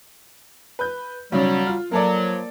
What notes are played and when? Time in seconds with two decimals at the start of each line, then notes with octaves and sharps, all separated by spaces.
0.79 B4 G6
1.32 B1 C#3 F#3 G3
1.67 F4
1.92 F3 F#3 A#3 A4 D5